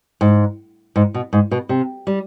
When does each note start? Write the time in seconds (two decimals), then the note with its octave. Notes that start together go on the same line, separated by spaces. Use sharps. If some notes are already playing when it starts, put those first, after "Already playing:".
0.21 G#2
0.96 G#2
1.14 B2
1.33 G#2
1.51 B2
1.69 C3
2.07 G3